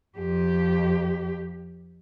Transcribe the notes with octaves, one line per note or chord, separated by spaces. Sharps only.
F2 G4